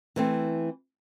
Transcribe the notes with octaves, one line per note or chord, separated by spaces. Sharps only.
E3 A3 C4